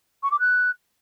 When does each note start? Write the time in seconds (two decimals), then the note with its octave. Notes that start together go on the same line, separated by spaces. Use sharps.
0.23 C#6
0.31 D6
0.39 F#6